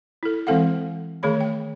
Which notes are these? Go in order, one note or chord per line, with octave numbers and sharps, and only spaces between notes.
E4 A4
E3 G#3 C4 A4 F5 F#5
D#3 A3 G#4 C#5 B5
G5